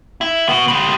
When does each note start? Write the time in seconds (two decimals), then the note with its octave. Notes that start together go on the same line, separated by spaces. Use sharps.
0.21 E4
0.49 B3 F#4
0.68 G3 G#3